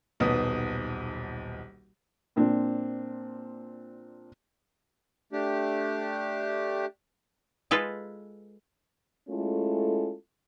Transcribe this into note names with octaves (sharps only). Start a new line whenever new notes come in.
D#1 B1 B3 D#6
A#2 C4 D4
A3 D4 G4
G#3 F4 A4 B4
G#3 A3 C#4 E4 F4 A4